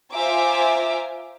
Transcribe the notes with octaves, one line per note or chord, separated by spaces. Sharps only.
F4 C5 E5 G#5 A#5 D6